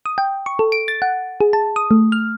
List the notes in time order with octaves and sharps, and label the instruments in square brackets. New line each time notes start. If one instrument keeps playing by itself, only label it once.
[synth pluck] D#6
G5
C#6
A4
D7
A6
F#5
G#4
A5
D#6
A3
F6